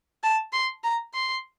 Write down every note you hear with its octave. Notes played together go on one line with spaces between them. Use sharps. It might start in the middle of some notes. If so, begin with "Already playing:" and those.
A5
C6
A#5
C6